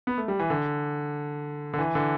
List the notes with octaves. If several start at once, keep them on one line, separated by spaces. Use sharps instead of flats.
B3
A3
G3
E3
D3
D3
E3
D3